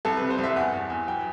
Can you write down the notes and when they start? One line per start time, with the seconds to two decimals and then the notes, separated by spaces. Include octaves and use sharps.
0.05 C2 A4
0.17 C3 B4
0.30 C5
0.38 C2
0.44 E5
0.56 E2 F#5
0.73 E2
0.90 E2
1.08 F#3 G5